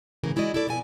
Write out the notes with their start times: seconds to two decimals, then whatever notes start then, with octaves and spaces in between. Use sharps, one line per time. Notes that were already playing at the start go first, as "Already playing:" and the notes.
0.24 A2 C#3 E3 A#4
0.36 G#3 E4 F#4 D5 D#5
0.54 E4 F#4 A4 D5
0.67 B2 F3 B3 D5 G#5